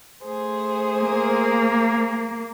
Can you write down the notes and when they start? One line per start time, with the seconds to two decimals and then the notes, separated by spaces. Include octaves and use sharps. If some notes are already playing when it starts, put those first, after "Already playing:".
0.24 A3 G#4 C5
1.00 A#3